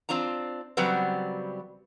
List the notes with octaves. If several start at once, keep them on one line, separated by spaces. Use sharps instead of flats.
C4 D4 F4 A#5
C#3 F#3 G3 B3 C4